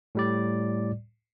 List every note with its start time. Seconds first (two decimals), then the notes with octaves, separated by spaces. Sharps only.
0.15 A2 G3 D5